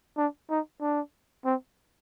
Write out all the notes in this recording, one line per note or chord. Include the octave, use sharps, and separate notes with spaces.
D4
D#4
D4
C4